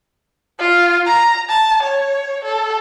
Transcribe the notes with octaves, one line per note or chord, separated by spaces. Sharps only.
F4
A#5
A5
C#5
A4